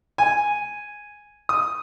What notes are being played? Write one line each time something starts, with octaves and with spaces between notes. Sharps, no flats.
G#5
D#6